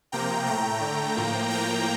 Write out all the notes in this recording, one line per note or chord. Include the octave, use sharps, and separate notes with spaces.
C3 F3 A#3 G5 A#5
A2 A3 G5 A#5
D3 A3
A2 F3 A#3
A2 F3 A#3 G5 A#5